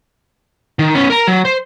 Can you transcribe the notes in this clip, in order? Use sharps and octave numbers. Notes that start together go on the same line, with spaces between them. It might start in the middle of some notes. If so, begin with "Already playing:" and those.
D#3
B3 C#4
A#4 A#5
F#3
C5